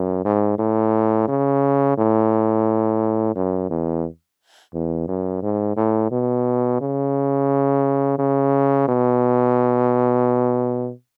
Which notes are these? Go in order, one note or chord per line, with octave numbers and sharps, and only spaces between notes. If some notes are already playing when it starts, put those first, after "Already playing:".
Already playing: F#2
G#2
A2
C#3
A2
F#2
E2
E2
F#2
G#2
A2
B2
C#3
C#3
B2